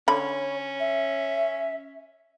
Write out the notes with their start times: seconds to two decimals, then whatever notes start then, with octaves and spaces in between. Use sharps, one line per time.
0.08 D3 C#4 C#5 B5
0.80 E5